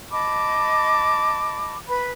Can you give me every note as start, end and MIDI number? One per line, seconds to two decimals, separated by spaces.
0.11 1.77 75
0.11 1.77 81
0.11 1.77 83
0.11 1.77 86
1.89 2.11 71
1.89 2.11 83